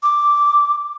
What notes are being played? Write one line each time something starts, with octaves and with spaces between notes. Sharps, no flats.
D6